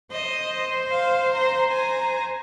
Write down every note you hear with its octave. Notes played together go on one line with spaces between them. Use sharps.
C5 D#5
F5
A#5 C6
G#5 A#5